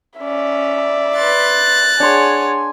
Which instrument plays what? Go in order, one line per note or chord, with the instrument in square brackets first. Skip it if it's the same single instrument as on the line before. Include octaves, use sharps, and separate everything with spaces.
[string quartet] C#4 [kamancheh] D5 E5
[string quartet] B4 C6 [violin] F#6 A6
[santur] D4 C6 [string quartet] G#4 C#5 F#5 [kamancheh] G#5